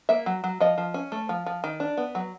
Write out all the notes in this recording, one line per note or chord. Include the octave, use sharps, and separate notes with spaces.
A#3 E5
F#3
F#3
F3 D#5
F3
C#4
A3
F3
F3
D#3
D4
B3
F#3